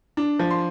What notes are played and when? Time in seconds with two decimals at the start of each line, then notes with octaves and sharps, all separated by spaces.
0.17 D4
0.39 F3
0.51 C6